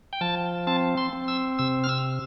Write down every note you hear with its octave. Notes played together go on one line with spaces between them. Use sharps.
G5
F3 A5
C4 A5
C6
C4
E6
C3 E6
F6
E6